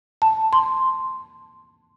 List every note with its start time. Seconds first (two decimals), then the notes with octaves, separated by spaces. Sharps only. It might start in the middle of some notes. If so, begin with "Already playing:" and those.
0.22 A5
0.53 C6